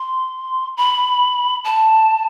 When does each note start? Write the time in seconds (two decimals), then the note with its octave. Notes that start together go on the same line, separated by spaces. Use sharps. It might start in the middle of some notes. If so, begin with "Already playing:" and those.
Already playing: C6
0.77 B5
1.64 A5